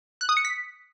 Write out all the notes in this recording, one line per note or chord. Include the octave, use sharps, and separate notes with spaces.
F#6
D#6
C#7
B6